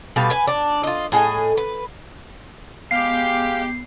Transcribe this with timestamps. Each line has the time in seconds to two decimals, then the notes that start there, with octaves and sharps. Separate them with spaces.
0.16 B2 G3 B4 F5
0.30 B4 G#5
0.47 D4
0.83 F4 D#5
1.12 A2 G#4 D#5 G#5
1.57 B4
2.91 G#3 B3 G4 F5 C7